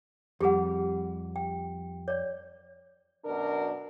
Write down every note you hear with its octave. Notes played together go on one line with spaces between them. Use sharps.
F2 G3 G4 G#4 F#5
G5
C#5 D5
F#2 B2 D4 A#4